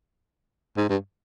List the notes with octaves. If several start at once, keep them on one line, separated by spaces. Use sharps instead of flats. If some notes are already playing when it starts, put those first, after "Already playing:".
G#2
G2